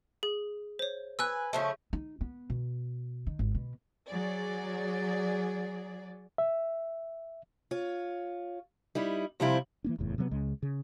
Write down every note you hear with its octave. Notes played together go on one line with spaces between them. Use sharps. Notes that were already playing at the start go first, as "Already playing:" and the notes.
G#4
C5 C#5
B4 G#5 E6 F#6
C#3 F3 A3
D#4
B3
B2
D#3
G#1
B2
F#3 G#4 D5
E5
F4 C#5
G3 D#4 E4
C3 F3 G3 C4 E4 F4
E3 A#3 D4
F1 E2 A2
C3 F#3 A3 B3
C#2 C#3 G#3
C#3